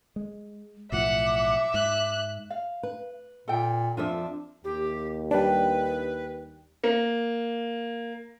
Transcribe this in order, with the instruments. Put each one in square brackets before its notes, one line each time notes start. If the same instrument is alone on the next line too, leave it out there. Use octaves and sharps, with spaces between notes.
[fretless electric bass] G#3
[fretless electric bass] B1 A2 F3 [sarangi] E5 [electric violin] F#5 [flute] D6
[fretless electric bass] G#2 [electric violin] F#6
[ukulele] F5
[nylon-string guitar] B4
[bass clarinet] A#2 [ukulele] A4 G5
[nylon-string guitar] F2 F3 E5 [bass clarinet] D4 [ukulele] F4 A4
[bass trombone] D#2 [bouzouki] A2 [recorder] G4
[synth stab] G3 D4 [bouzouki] G4 G5 [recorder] B4
[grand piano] A#3